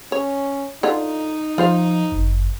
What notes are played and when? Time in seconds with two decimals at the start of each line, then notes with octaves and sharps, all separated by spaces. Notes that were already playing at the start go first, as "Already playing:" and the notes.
0.12 C#4 C#5
0.83 D3 D#4 F4
1.58 F3 F4 C5 F5
2.12 G1 F#2